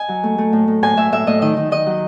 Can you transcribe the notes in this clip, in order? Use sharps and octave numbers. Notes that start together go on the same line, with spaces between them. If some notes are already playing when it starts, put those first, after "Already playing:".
Already playing: D#5 G#5
F#3
A3
A3
A2
A2
A2 G#5
A2 E5
A2 E5
A2 D#5
D#3 D#5
D#3
D#3 D#5
F#3